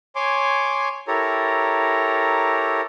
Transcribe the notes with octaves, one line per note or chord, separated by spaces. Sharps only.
C#5 G#5 C6 D6
E4 G4 A4 A#4 C#5 A#5